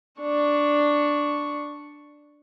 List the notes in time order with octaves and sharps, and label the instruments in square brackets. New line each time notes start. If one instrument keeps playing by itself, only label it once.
[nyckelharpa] D4 C#6